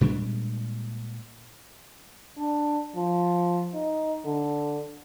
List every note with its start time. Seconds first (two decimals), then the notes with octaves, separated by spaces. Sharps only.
0.01 A#2 G3 G#3 D4
2.37 D4
2.96 F3
3.74 D#4
4.25 D3